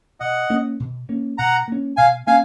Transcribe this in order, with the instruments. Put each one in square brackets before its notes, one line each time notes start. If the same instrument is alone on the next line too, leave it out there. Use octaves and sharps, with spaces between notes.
[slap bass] B2 [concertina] D#5 F#5
[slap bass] A#3 C#4
B2
A#3 C#4
[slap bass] B2 [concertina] F#5 A#5
[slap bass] A#3 C#4
[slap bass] B2 [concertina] F5 G#5
[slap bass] A#3 C#4 [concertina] F5 G#5